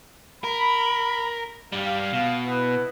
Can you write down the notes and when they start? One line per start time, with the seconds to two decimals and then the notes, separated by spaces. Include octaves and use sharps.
0.44 A#4 B5
1.72 G2 G3 F5
2.13 B2
2.45 B3 E4 B4